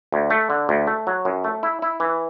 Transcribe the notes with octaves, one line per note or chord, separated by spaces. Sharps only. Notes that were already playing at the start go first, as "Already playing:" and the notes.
D2
A3
D3
D2
A3
F#3
F#2
A3
E4
E4
E3